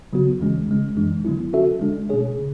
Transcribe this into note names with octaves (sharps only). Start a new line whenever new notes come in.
C#3 F#3 B3 F#4
E2 C#3 E3 G#3 C#4
C#3 G#3 C#4
F#2 E3 G#3 D4
D3 F#3 B3 E4
F#3 C#4 F#4 A4 E5
D3 G#3 D4
B2 A3 C#4 G#4 C#5
C#3